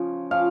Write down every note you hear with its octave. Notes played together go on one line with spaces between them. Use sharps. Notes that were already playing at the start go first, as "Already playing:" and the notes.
Already playing: C#3 F3
C#3 F3 F5